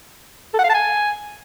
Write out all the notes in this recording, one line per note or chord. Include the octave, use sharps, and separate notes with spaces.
A4
F#5
F5
A5
G#5